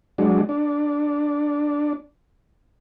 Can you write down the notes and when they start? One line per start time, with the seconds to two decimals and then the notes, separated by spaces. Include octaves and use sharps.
0.18 F#3 G#3 D4
0.49 D4